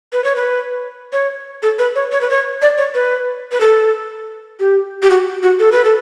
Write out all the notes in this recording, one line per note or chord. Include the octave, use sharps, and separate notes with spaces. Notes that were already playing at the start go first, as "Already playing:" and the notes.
B4
C#5
B4
C#5
A4
B4
C#5
C#5
B4
C#5
D5
C#5
B4
B4
A4
G4
G4
F#4
F#4
A4
B4
A4